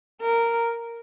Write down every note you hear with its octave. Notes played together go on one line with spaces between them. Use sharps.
A#4